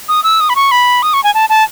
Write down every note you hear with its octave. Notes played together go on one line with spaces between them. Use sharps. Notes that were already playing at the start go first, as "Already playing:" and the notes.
D#6
E6
D#6
B5
C#6
B5
D#6
C#6
G#5
A5
A5